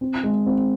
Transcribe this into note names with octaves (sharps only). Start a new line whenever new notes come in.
C4
G#3
C4